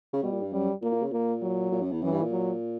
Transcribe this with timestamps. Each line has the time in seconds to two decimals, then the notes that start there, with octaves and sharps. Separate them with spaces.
0.13 C#3
0.23 B2 G3
0.32 A#2
0.42 G2
0.52 F#2 G3
0.82 A#2 A#3
0.92 A#2
1.02 C#3
1.12 A#2 A#3
1.42 F#3
1.72 A#2
1.82 F#2
1.92 E2
2.02 F#2 E3
2.12 G2
2.22 A#2
2.31 F#3